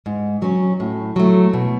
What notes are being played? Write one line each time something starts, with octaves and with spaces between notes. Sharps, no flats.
G#2
F#3 C#4
A2
F#3 A3
B2